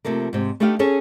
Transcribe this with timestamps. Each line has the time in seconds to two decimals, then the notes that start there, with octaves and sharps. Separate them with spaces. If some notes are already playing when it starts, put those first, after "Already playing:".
0.05 C3 F3 A3 A#3
0.33 G#2 C3
0.60 A3 B3 D4 D#4 G4 F5
0.79 C#4 G#4 A4 C#5